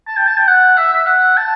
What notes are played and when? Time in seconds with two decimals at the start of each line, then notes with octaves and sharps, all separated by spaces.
0.08 A5
0.17 G5
0.27 A5
0.37 G5
0.47 F#5
0.77 E5
0.92 E5
1.06 F#5
1.37 A5